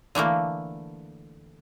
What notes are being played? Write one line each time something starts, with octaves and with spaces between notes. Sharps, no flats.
D3 E3 A3 A#3